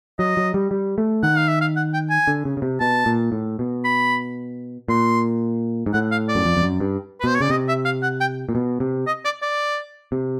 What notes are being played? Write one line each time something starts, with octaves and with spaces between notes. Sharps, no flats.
F#3 D#5
F#3
G3
G3
A3
D#3 F#5
F5
E5
F5
F#5
G5
G#5
D3
C#3
C#3
C3
B2 A5
A#2
A2
B2
B5
A#2 C6
G#2
A2 F#5
F5
D5
F#2
F2
F2
F#2
G2
B4
B2 C5
C#5
C#3 D5
C3 D#5
E5
F5
F#5
G5
A#2
B2
C3
D#5
D5
D5
C3